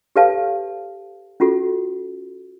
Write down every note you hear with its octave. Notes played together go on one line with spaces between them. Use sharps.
G4 A4 B4 C#5 F5 A5
C#4 F4 F#4 A4